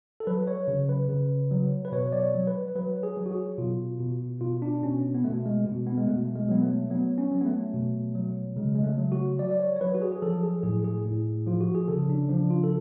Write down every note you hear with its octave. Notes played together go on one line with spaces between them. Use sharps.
A4
F#3 B4
C#5
C#3
B4
C#3
F#3
B4
B2 C#5
D5
C#5
F#3
B4
F#3 B4
G#4
F#3
F#4
G#4
B2 F4
B2
B2 F4
D4
B2 C#4
B3
B2 A3
G#3
B2
B3
G#3
B2 A3
G#3
F#3 B3
A3
F#3 B3
C#4
F#3
B3
A3
B2
F#3
C#3 G#3
G#3
A3
F#3
F#4
F#3 D5
D5
C#5
C#5
F#3 B4
F#4
G#4
G#4
F3 A4
G#4
A2 G#4
G#4
A2
F3 F4
F#4
G#4
C#3 A4
D4
F3 D4
F4
A4